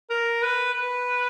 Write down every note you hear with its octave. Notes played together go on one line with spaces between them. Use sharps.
A#4
B4
B4